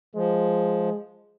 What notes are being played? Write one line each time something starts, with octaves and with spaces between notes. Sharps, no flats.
F3 G#3